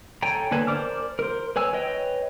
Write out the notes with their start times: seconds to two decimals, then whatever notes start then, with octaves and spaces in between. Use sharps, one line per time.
0.22 A4 C#5 G5 G#5 A#5
0.51 D3 A#3 B4 G#5 A5
0.67 A#4 C5 D5 D6 F6
1.19 A#4 C5
1.56 B4 C#5 G#5 E6
1.73 B4 C#5 D#5 G5